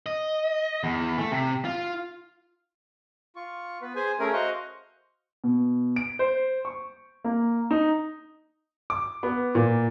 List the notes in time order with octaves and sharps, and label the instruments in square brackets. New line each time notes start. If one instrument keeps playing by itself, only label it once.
[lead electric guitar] D#5
E2
A3
C3
F4
[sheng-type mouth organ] F4 C#6
B3 B4
G#4 C5 G#5
A3 C#4 G#4 A#4
F#4 C5 D#5 F5 C#6
[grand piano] B2
D7
C5
C#6
A#3
D#4
D6
B3
A#2